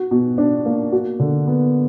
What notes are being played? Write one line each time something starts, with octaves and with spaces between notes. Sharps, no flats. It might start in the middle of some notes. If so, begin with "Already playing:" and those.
Already playing: F#4
B2
D4
A#3
F#4
D3
B3